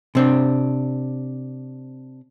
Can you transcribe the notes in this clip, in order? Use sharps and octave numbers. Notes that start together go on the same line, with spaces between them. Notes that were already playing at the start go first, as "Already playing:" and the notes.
C3 C4 D4